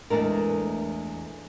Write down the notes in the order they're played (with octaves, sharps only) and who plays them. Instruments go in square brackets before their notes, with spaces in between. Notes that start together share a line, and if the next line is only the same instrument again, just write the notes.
[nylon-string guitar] E2 G#3 A3 D4 A#4